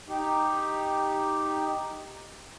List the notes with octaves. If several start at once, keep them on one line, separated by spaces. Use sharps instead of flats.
D#4 G4